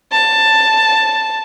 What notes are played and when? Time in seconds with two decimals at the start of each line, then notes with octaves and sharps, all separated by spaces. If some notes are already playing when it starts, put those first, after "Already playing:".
0.12 A5